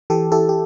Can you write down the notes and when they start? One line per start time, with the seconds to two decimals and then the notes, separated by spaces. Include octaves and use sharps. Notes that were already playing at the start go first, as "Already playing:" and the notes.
0.10 E3 G4 A4
0.32 E4 G4 A4
0.49 G4